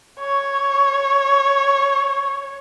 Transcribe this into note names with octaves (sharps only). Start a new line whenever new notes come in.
C#5 C#6